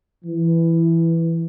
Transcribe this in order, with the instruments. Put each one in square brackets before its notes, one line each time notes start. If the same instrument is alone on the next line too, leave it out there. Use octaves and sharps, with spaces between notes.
[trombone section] E3